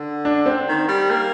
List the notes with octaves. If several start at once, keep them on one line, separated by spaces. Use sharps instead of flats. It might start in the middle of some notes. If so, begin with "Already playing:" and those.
Already playing: D3
D4
C4
D#3
G3
A#3